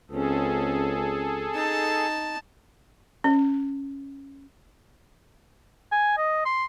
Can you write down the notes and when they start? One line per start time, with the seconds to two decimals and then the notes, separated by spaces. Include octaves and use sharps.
0.11 C#2 C4 C#4 G#4 A4
1.55 D#4 A5
3.24 C#4
5.92 G#5
6.17 D#5
6.45 C6